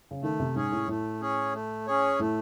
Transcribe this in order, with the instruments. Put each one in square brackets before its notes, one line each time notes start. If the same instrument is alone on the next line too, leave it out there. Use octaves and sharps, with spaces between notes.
[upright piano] C#3
[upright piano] D#3 [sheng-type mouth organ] A3
[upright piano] C3
[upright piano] G#2 [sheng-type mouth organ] C#4 G#4 C#5
[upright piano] A2
[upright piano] A2 [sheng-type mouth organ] A3
[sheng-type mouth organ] C#4 G#4 C#5
A3
C#4 G#4 C#5
[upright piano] A2 [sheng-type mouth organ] A3